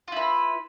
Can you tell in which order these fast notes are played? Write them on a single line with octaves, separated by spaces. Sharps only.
F4 E4 B4